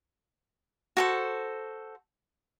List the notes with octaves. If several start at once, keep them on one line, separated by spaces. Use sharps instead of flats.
F#4 A4 C5